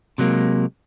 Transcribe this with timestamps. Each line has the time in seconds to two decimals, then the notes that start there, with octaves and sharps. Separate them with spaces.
0.18 C3 F#3 G#3 A#3